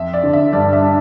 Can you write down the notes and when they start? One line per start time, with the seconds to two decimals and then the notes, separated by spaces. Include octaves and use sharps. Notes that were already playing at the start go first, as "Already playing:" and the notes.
Already playing: F2 E5
0.13 D5
0.23 D3
0.33 E5
0.53 G2 D5
0.73 E5
0.82 D4